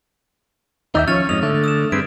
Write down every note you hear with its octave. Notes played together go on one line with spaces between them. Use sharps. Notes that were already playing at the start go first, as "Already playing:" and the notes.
D#2 D#4 D5 E5 G5 E6
F3 C#4 C#5 F6 A6 F7
F2 G#2 D#5 F7
D3 A3
D#6 E7
G2 C4 G#4 B4 D7